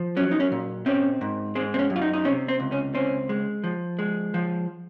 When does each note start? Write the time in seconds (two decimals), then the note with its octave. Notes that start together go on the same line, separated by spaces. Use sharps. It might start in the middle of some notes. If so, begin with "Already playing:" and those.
Already playing: F3
0.17 F#3 C#4
0.31 D#4
0.40 C#4
0.52 A#2
0.86 C4 C#4
1.21 G#2
1.55 G#3 C4
1.74 C4
1.79 C#4
1.90 F#2
1.96 F4
2.02 D#4
2.13 D#4
2.25 C3 C#4
2.48 C4
2.60 C#2
2.72 C#4
2.95 C4 C#4
3.29 G#3
3.64 F3
3.99 G#3
4.34 F3